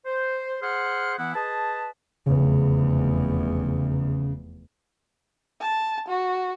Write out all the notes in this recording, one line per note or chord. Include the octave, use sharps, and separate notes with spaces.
C5
G#4 C5 F#5 C6 F6
E3 B3 E4 F#5
G#4 B4 D#5 A5
F1 E2 C#3
A5
F#4